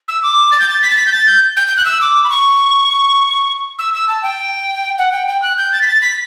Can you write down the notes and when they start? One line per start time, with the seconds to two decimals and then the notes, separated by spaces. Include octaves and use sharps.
0.08 E6
0.23 D6
0.52 A6
0.60 G6
0.69 A6
0.82 B6
0.90 A6
0.97 B6
1.06 G6
1.12 A6
1.26 G6
1.57 G6
1.67 G6
1.77 F#6
1.85 E6
2.01 D6
2.24 B5
2.30 C#6
3.79 E6
3.94 E6
4.09 A5
4.23 G5
4.98 F#5
5.12 G5
5.28 G5
5.42 F#6
5.57 G6
5.73 A6
5.82 B6
5.87 A6
6.02 B6